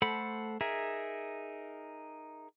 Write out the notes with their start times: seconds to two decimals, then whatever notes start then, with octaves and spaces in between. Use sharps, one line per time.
0.02 A3 A4 C5 F#5 B5
0.61 D#4 G#4 A#4 E5